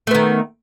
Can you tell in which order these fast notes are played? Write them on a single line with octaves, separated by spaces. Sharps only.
A3 B3 D#3